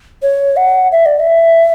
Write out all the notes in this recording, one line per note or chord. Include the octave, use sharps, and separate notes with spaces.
C#5
F#5
E5
D5
E5